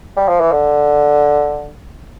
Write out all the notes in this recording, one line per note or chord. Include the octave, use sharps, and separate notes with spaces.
G3
F3
E3
D3